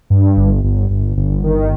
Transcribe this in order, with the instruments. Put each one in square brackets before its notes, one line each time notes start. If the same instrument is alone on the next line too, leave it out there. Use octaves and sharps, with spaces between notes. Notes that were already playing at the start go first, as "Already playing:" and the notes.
[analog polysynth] G2
G1
G1
G1
G1
D#3